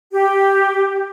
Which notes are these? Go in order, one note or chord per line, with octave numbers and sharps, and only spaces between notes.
G4